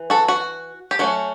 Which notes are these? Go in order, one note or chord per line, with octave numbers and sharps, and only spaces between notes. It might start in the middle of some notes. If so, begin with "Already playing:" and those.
Already playing: E3
F#4 A4
F#4
G4
F#3 A3 C#4 F#4